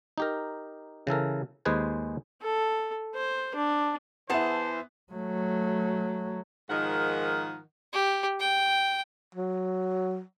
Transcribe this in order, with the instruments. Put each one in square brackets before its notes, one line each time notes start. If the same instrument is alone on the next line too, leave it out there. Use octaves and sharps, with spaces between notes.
[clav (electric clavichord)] D#4 G4 A#4
C#3 E3 A4 A#4
D#2 G#3 G#4 B4 C5 G#5
[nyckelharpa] A4
C5
D4
[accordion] E3 [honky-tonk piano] B3 E4 [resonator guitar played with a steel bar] G#4 F#5 A5 [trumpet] C5
[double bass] F#3 A3
[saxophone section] G#2 D#3 F3 A#4 D#5 F#5
[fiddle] G4
G5
[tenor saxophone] F#3